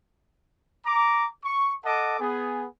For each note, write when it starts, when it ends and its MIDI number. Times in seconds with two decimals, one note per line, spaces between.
0.86 1.27 82
0.86 1.27 86
1.44 1.73 85
1.85 2.15 69
1.85 2.15 75
1.85 2.15 78
1.85 2.15 81
1.85 2.15 86
2.20 2.65 59
2.20 2.65 68